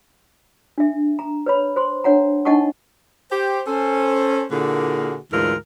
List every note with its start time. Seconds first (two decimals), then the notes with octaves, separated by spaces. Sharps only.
0.78 D4 E5
1.19 A#5
1.46 B4 C#5 B5
1.76 C5 C6
2.04 D4 C#5 F#5 A#5
2.45 D4 D#4 D#5 F#5 A5 C#6
3.31 G4 C5
3.67 C#4 A4 C5
4.51 A#2 D3 A#3 E4 F#4 G#4
5.32 D2 G#2 E3 D4 F4 A#4